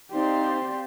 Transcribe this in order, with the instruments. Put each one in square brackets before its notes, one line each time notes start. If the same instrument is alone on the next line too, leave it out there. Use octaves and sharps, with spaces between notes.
[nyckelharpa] C4 C6 [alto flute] D#4 [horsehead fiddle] G4 [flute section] C5 D5 F5